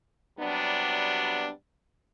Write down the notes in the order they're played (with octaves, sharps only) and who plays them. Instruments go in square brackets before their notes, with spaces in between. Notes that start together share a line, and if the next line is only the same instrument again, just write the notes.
[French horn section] C3 F#3 G3 B3 D4